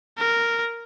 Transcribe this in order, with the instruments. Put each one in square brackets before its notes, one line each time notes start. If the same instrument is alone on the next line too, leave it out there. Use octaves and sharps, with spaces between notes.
[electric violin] A#4